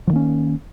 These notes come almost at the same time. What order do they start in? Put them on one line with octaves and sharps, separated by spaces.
F3 D#3 A#3 C#4